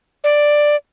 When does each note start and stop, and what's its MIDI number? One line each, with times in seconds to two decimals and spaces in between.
0.24 0.76 74